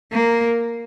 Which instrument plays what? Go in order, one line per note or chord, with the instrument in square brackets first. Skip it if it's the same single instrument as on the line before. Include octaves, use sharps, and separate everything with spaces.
[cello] A#3